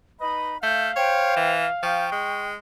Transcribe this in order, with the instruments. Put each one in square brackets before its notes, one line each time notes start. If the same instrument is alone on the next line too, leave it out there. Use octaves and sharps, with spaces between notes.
[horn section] D#4 B4 D#5 [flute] B5
[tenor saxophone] A3 [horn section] F5 [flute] G6
[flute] C5 [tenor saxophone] C#5 [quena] G5
[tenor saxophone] E3
[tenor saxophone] F3 [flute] G5 [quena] C#6
[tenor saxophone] G#3